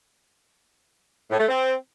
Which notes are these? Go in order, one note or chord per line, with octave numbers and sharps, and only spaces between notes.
A2
A3
C4